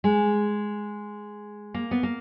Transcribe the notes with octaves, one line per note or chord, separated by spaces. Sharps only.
G#3
A#3
B3
A#3